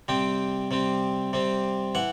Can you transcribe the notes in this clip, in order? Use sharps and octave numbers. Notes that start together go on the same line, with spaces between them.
C3 G3 C4 G5
C3 G3 C4
C3 G3 C4
E3 F#5